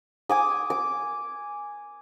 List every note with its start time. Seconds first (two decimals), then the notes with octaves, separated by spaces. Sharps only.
0.29 G#5 D6 D#6
0.70 D6